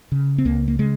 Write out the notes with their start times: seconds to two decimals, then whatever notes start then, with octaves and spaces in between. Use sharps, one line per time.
0.12 C#3
0.38 C4
0.45 C#2 A#3
0.68 A#3
0.79 C#3 G#3